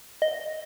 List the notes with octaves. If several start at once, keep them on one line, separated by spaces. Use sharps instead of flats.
D#5